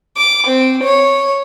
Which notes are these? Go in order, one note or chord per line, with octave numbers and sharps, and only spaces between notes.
D6
C4
C#5